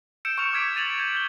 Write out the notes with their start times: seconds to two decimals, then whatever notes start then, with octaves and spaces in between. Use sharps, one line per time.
0.25 E6 G6 C#7 D7 E7
0.38 C#6 F6 C#7 F7
0.52 C#6 D6 F6 G#6 B6 D7
0.75 G#6 A6 D#7 F7 F#7
0.99 G6 D7
1.14 G6 G#6 G7